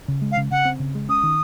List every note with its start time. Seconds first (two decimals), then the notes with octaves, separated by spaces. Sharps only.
0.08 C#3
0.22 G#3
0.32 F5
0.37 C#3
0.51 C#3 F#5
0.65 C4
0.80 C#3
0.95 G#3
1.09 C#4 D#6
1.23 D#3